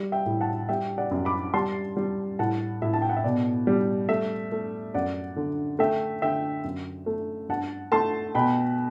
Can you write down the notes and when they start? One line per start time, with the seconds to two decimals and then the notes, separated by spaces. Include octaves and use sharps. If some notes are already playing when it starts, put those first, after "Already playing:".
Already playing: G3
0.12 E5 G5
0.26 A2
0.41 F#5 A5
0.69 G3 E5 G5
0.98 D5 F#5
1.11 F#2
1.25 B5 D6
1.54 G3 A5 C6
1.97 G3
2.39 A2 F#5 A5
2.82 A2 E5
2.94 A5
3.02 G5
3.09 F#5
3.17 E5
3.24 B2 D5
3.67 G3
4.09 A3 E5
4.52 A3
4.94 F#2 D5 F#5
5.36 D3
5.79 A3 E5 G5
6.22 D3 E5 G5
6.64 F#2
7.06 A3
7.49 G2 F#5 A5
7.92 A3 A5 C6
8.35 B2 G5 B5